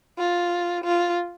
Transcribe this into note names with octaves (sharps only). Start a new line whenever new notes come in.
F4
F4